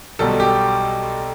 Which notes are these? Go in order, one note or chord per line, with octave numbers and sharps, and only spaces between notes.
B1 B2 G3 A4
G4